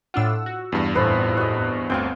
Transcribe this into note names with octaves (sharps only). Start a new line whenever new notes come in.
A2 D4 F4 F#5 E6
F#4
E2 G2
F2 A2 B3 E4 C5
F#4 D#5
G1 D2 C4 F5 G5